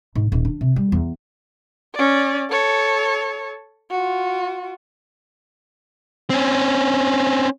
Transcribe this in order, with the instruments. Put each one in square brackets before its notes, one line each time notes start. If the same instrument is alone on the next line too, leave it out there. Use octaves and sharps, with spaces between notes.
[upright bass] G#2
D#1
D4
C3
G3
E2
[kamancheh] C#4 D5
A4 C#5
F4 F#4
[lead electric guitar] C4 C#4